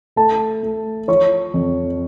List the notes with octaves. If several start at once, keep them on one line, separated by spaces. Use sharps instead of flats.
A3 A4 A5
A3
F3 C#5 C#6
F2